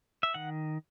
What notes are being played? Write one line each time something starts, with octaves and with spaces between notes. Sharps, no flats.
E5
D#3 F#5